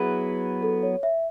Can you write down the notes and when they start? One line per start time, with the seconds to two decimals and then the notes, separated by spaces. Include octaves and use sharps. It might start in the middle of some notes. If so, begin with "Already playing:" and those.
Already playing: F#3 B3 E4 G#4 B4
0.63 A4
0.83 C#5
1.03 E5